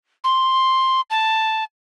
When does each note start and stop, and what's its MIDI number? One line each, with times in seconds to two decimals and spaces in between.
0.24 1.01 84
1.10 1.64 81